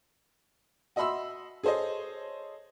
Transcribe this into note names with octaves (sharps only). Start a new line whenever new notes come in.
F#4 D#5 E5 B5 C6 E6
G#4 A4 C5 C#5 D#5